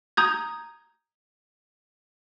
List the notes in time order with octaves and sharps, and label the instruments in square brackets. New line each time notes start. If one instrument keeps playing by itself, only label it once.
[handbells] A#5 D#6 G6 G#6